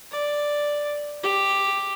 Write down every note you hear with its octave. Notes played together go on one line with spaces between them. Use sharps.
D5
G4